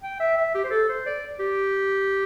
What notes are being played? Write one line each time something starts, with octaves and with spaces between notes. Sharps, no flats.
G5
E5
E5
G4
C5
A4
C5
D5
G4